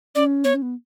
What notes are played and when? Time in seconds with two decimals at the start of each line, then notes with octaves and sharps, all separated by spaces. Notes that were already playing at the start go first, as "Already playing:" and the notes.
0.15 C#4 D5
0.44 B3 C#5
0.54 C#4
0.62 B3